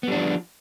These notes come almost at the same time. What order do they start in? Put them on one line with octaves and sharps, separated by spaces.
B3 G3 D4 F3